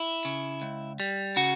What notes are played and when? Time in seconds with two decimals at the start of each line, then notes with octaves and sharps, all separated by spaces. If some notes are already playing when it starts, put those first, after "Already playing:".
Already playing: E4
0.25 C#3
0.62 C#2
1.00 G3
1.36 C#3 F#4